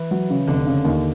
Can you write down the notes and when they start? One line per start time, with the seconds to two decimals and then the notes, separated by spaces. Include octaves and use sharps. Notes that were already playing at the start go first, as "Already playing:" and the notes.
Already playing: E3
0.11 F#3
0.30 C#3
0.47 F1 D3
0.67 C#3
0.85 D#2